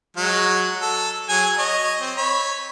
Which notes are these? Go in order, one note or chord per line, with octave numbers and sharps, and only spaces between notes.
F#3 G#3 F#4
A4
F#3 G#4 G#5
C#5 D#5
C4
C#5 B5